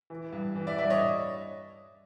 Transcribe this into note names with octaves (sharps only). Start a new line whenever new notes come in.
E3
G2
E3
D5 E5
G2 D5 E5
C#5 D#5